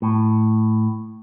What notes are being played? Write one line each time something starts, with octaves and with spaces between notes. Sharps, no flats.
A2